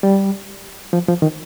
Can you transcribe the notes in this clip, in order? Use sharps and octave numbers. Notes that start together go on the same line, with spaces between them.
G3
F3
F3
D#3